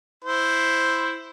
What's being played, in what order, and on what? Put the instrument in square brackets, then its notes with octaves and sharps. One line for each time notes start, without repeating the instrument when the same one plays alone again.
[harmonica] E4 C5